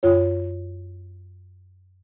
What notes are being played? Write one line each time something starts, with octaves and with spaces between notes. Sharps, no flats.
F#2 F4 C#5